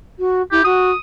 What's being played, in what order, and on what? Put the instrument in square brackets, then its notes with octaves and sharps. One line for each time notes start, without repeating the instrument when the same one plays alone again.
[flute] F#4
[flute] E4 [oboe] G4
[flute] F#4 [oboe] D#6